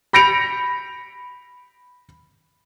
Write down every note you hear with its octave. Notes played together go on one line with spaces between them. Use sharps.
B5 G6 A#6 C#7 D7 F7